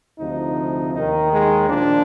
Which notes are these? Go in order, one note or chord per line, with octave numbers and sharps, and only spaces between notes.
D2 C3 F3 D#4
D#2 D#3 D#4
G#3
A#2 F3 D4